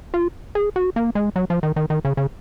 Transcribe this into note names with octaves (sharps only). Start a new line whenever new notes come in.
F4
G#4
F#4
A#3
G#3
F#3
F3
D#3
D#3
D#3
C#3
C#3